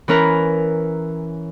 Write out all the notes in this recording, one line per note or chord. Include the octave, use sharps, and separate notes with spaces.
E3 C#4 A#4 B4